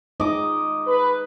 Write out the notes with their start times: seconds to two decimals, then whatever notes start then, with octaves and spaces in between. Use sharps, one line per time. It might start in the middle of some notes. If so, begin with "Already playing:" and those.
0.20 G#3 D#4 D#5 D6
0.87 B4